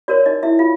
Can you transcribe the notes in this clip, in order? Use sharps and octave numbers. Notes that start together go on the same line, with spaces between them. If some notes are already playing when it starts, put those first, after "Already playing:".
F#4 A#4 C#5 D5
D#4 D#5
E4 E5
F4 F5